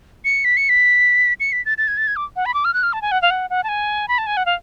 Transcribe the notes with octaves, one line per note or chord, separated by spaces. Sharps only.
C#7
B6
C#7
B6
C#7
B6
A6
A6
G#6
A6
G#6
D6
F#5
B5
D6
F6
F#6
F6
A5
G#5
F#5
F5
F#5
F#5
A5
G#5
B5
A5
G#5
F#5
F5